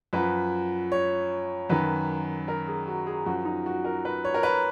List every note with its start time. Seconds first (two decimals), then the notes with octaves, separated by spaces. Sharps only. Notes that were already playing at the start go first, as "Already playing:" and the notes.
0.13 F#2 F3 B4
0.92 C#5
1.69 F#2 D#3 B4
2.48 A#4
2.67 G#4
2.87 F#4
3.07 G#4
3.26 F#2 F3 F#4
3.45 D#4
3.66 F#4
3.85 A#4
4.05 B4
4.25 C#5
4.34 A#4
4.43 B4